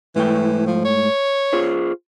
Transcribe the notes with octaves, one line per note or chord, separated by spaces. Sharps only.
G#2 E3 A3 G5
F3
C#5
F4 G#4 C5